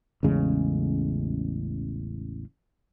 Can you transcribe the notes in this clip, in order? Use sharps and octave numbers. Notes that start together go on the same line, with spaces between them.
A1 E2 C#3 G#3